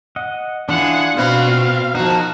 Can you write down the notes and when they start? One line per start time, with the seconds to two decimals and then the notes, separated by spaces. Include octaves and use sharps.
0.16 D#5 F#5
0.69 E3 D4 F4 G#4 F#5
1.17 B2 B3 C4 B4 F5
1.95 F3 D#4 F#4 A#4